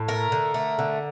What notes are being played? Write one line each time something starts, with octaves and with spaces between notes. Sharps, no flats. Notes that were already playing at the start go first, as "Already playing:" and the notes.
Already playing: A2
A3 A#4
D3
A3
D3